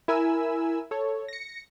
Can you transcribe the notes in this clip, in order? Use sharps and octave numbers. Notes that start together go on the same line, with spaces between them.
E4 A#4 G#5 B5 E6
A4 C#5
A#6 C#7